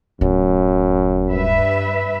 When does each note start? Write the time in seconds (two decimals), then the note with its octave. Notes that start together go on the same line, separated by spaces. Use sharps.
0.21 D1 F#2
1.30 G2 B4 E5